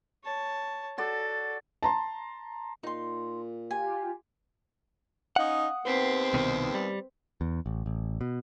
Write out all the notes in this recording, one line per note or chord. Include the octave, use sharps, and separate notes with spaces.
C#5 A5
F#4 A4 D5
A5 A#5 C6
A#2 D#4 C6
F4 G4 G#5
C#4 D#4 F5 F#5 D#6
D#2 C3 B3 C4 B4 B6 C7
C2 B2 D#3
G3
E2
A1
A1
B2